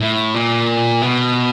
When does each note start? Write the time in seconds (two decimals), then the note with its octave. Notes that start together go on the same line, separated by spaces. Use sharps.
0.01 A2
0.34 A#2
1.02 B2